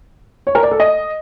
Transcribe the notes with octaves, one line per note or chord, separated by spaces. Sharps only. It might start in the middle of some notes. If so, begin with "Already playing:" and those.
C#5
A#4
D5
A4
D#5